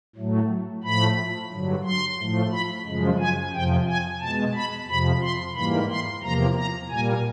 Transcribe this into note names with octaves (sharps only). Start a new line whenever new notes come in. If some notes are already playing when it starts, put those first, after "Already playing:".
A2 F#3 A3
A2 F3 A3 B5
G2 D3 F#3
C6
A2 F3 A3
B5
F#2 C#3 F3 G#3
G#5
F2 C3 F3 G5
G#5
B2 G#3 A5
B5
F2 C3 F3 B5
C6
G#2 E3 G3 A#3 B5
C6
E2 C3 F3 A#3 A#5
A#5
A#2 G3 A#3 G#5